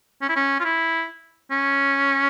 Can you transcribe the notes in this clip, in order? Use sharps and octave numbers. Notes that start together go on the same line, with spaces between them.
C#4
E4
C#4
F4
E4
C#4